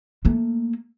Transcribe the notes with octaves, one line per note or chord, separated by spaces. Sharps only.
A3 A#3